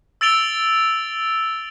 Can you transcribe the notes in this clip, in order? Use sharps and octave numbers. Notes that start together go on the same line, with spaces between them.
E6 A6 D7 F7 G7